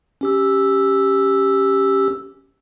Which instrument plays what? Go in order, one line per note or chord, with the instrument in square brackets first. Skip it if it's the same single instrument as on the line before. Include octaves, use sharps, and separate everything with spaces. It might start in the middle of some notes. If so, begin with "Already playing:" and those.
[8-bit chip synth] C#4 G4 E6